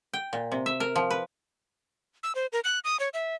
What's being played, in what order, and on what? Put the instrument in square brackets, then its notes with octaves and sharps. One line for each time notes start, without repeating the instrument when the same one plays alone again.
[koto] G5
A#2
C3
E5
A#4
F3
B4
[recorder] E6
C5
A#4
F#6
D#6
C#5
E5